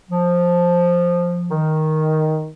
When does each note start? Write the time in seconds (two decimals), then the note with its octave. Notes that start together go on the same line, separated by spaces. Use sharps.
0.10 F3
1.51 D#3